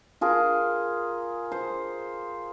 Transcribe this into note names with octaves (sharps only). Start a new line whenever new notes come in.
F4 G#4 A#4
C5